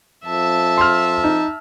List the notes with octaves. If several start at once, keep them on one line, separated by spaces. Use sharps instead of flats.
F2 E5 A5
C6 F6
D#4